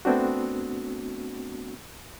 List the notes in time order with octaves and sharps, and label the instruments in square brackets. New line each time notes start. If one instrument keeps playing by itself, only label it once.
[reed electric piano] A3 B3 C4 D4 F#4